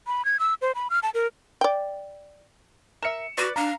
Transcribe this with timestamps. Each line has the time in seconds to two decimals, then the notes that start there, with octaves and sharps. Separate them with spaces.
0.07 B5
0.25 G#6
0.39 E6
0.62 C5
0.75 B5
0.90 F6
1.03 A5
1.14 A#4
1.61 D5 G5
3.03 A#4 E5 C#7 E7
3.38 F#4 B4 D5
3.56 D4 F5 A#5